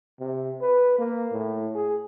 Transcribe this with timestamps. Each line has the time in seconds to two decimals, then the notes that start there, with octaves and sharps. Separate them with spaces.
0.20 C3
0.61 B4
0.98 A#3
1.32 A2
1.75 G#4